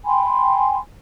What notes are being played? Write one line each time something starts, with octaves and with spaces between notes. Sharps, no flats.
G5 G#5 B5 C6